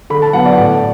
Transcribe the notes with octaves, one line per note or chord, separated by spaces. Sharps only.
D3 B5
A5
F#3 B3 F#5
D5
A2